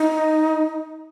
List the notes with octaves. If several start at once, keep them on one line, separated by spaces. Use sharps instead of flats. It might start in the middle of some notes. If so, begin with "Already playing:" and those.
Already playing: D#4